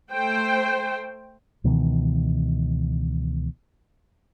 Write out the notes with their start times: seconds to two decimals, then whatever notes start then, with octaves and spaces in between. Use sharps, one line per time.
0.12 A3 C5 G5
1.64 C#2 B2 D#3 E3